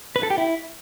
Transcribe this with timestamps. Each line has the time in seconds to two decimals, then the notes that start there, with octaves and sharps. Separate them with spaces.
0.16 B4
0.23 A4
0.30 G4
0.38 E4